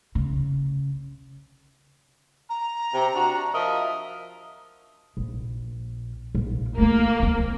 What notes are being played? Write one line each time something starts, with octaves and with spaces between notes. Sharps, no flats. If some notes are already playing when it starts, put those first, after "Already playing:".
C#3
A#5
C3
D4 F#4
F3 A#4 D#5 E5
A#1
A#1
A3 A#3 F4
D#2 C4